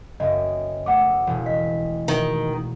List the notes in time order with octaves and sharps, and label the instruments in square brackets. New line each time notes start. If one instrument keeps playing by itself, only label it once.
[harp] F#1 B3 [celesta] D#5 E5
[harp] A3 B3 [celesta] F#5 D6
[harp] E1
[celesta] D#5 [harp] B6
[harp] B2 [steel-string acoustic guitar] D#3